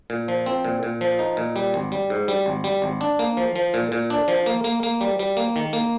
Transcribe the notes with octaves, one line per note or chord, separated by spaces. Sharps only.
A#2
F3
C4
A#2
A#2
F3
D#4
A#2
G3
G#1
G3
G#2
G3
G#1
G3
G#1
D4
A#3
F3
F3
A#2
A#2
D4
F3
A#3
A#3
A#3
G3
G3
A#3
D#3
A#3